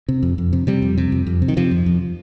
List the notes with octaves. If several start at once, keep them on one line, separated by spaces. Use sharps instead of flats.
C3
F2
F2
C3
C3 G3
F2
C3
F2
F2
C3
D#3
C3 F3
F2
F2